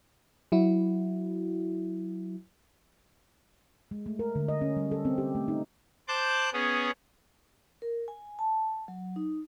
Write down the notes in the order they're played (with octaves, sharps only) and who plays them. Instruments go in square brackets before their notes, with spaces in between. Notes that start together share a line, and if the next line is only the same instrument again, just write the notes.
[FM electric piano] F#3 E4 F#4
[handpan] G#3
A3
A#4
D3
D#5
C#4
G3
A4
C4
G4
A3
D#4
[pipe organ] C5 A5 D6 F#6 G6
B3 C#4 G#4
[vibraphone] A#4
G#5
A5
F#3
D#4